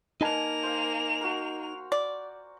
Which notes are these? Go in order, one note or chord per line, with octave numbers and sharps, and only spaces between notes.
A#3 D#4 A#4 B4 D#5 G#5 A5 F7
C5 F5
F#4 A#4
D5